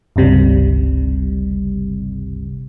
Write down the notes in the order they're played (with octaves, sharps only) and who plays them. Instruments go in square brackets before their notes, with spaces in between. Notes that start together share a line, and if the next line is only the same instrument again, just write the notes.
[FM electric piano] G1 C#2 C3 G3